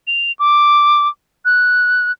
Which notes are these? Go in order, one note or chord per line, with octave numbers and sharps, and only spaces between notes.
F7
D6
F#6